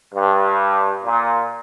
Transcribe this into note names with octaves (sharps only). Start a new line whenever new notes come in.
G2
A#2